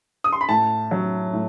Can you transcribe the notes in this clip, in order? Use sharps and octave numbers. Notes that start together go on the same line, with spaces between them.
D#6
C6
B5
A2 A5
F#3
A2